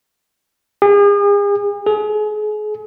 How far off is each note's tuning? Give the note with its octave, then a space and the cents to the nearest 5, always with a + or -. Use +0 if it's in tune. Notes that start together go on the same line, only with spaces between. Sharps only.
G#4 -40
G#4 +35